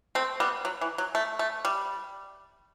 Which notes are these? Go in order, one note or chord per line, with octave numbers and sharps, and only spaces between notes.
A3 C4
G3 B3
F#3
E3
F#3
A3
A3
G3